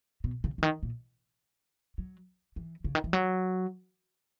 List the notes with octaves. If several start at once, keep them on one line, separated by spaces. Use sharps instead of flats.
B2
C#3
C#3
D#3
A#2
F#3
E3
C#3
D#3
E3
F#3